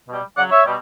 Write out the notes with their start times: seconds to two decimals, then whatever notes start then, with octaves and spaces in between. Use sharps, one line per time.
0.09 B2 G3
0.36 C#3 F#3 D5 F#5
0.51 C#5 E5
0.65 B2 G3